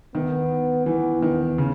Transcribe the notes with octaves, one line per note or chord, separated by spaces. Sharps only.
D#3 B3
E3 B3
D#3 B3
C#3